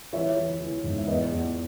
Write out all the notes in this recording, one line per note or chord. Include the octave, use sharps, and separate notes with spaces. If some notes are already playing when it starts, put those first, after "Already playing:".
E3 C#5 E5
E3
E3
G#2
E5
E2 B4 D#5
E2